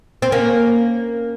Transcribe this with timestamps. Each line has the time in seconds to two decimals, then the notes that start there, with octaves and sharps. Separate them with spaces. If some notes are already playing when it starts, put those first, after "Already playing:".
0.22 C4
0.32 A#3 C#4